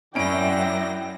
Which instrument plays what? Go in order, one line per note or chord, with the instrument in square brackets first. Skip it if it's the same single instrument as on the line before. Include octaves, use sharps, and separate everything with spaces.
[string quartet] F#2 A#6 [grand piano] C#4 D7 [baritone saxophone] E4 [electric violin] D5 G5